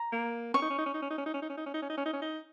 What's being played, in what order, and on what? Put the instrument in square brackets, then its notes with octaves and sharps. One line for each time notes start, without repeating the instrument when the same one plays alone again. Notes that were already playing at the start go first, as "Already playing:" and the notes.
Already playing: [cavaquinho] A#5
[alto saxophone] A#3
[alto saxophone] C#4 [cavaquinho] C#6
[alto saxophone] D#4
C#4
D#4
C#4
D#4
C#4
D#4
C#4
D#4
C#4
D#4
C#4
D#4
C#4
D#4
C#4
D#4
C#4
D#4
C#4
D#4